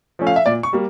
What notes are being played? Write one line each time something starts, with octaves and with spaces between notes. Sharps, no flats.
F3 A3 C#4
F5
E5
A#2 D5
C#6
G3 A#3